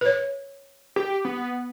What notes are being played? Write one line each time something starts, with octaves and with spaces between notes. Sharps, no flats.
B4 C#5
G4
B3